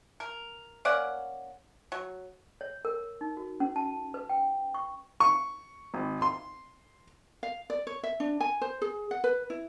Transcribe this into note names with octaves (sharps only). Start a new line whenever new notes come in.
A#4
A#3 C#4 D5 F#5
F#3
C#5
A#4
D#4
F#4
C#4
A5
B4
G5
C#6
C#6
G#1
C6
F5
D5
C#5
E5
D4
G#5
C5
G#4
F#5
B4
E4